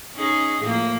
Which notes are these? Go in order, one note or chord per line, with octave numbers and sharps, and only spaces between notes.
C#4 D#4 G#4
A2 F3 A#3